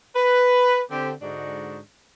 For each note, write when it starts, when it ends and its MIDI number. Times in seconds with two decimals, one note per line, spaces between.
0.16 0.81 71
0.90 1.12 50
0.90 1.12 60
0.90 1.12 67
1.22 1.79 44
1.22 1.79 50
1.22 1.79 56
1.22 1.79 62
1.22 1.79 63
1.22 1.79 66